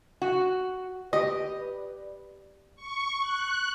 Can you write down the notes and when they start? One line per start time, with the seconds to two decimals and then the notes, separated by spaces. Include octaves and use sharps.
0.22 F#4
1.13 G4 B4 D5 D#5
2.76 C#6
3.21 F#6